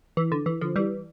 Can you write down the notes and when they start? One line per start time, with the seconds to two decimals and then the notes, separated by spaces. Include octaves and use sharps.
0.17 E3
0.32 D3
0.46 E3
0.61 D3 F3
0.76 E3 G3